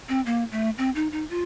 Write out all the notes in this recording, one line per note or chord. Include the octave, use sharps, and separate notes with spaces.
C4
A#3
A3
C4
D#4
D#4
F4